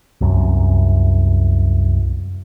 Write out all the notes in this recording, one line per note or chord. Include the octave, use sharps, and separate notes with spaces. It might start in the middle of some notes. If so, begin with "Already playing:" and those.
C2 F#2